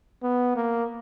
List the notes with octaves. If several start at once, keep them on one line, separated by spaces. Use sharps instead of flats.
B3
A#3